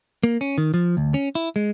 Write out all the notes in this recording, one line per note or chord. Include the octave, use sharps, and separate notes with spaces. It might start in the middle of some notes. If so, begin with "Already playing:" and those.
A#3
C#4
D#3
F3
D2
C#4
E4
G#3